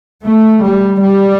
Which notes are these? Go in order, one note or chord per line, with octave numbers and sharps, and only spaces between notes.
A3
G3
G3